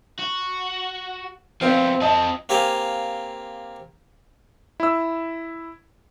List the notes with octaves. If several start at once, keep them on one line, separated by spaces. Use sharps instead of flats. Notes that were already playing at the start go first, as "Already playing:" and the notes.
F#4
F3 B3 C4 F5
F3 C4 D#5 A5
A#3 C4 G4 F5 G5 G#5
E4 E6